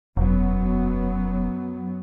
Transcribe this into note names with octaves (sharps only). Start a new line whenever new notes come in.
E1 F#2 F#3 B3